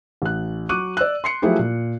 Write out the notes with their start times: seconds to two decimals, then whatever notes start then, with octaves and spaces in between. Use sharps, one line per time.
0.22 A1 F#6
0.69 F#3 C#6 D6 F#6 D#7
0.97 D5 E6 F#6
1.24 C6 C7 C#7
1.42 F3 F#3 A3 E4 G4 G#4
1.59 A#2